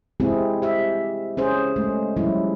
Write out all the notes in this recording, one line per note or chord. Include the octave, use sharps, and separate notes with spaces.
G#3 C4 E4 G4 G#4
G4 E5
C#4 G#4 C5
G#3 A3
F3 G3 C#4 E4